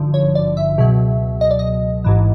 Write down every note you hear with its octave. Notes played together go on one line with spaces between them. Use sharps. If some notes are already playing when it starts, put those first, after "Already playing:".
Already playing: G#1 G2 D3 F3
C#5
D5
E5
C#2 B2 F#3
D#5
D5
D#5
A1 G#2 E3